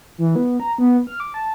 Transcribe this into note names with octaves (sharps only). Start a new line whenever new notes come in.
E3
B3
A#5
B3
F6
D6
A5